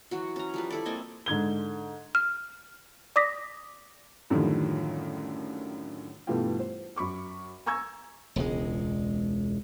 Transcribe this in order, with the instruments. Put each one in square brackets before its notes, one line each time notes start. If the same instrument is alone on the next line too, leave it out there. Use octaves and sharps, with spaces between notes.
[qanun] E3 F#3 F#4
C#4 A#5
F3 G3 B4
E4 A4 D5
A#3 C4 D#5 G#5
[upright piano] G#2 D3 G#6 G7
[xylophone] F6
D5 D6 D#6 A#6 B6
[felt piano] F#2 A2 D3 D#3 F3 G3
G2 B2 E3 A3 F4 G4
C5
F#2 B5 C#6 D6
G#5 A#5 C#6 E6 G#6
[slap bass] E1 C#2 G#3